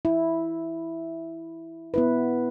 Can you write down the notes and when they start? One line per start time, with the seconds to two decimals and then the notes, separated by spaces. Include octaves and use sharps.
0.05 E4
1.94 B3 E4 B4